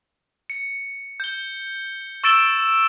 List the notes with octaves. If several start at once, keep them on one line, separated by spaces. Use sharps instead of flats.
C#7
G6 G7
C#6 E6 A6 D7 E7 G7